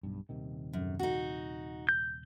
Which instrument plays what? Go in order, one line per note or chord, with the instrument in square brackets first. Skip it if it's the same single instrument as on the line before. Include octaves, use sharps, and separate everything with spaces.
[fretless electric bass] B1 G2
D#1 C3 D#3
[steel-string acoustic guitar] F#2
D#4 F#4
[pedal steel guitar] G6